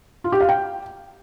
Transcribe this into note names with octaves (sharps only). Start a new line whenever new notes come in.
F4
G4
F5
G5